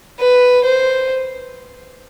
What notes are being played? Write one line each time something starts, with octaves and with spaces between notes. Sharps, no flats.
B4
C5